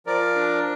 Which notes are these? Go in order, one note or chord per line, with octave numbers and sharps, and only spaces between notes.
F3 A#4 D5
D4